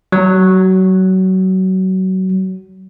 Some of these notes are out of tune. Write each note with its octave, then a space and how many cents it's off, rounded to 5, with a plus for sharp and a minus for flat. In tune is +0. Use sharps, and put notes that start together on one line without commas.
F#3 +25